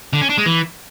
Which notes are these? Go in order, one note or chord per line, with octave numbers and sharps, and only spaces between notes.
D3
C#4
D4
G#3
E3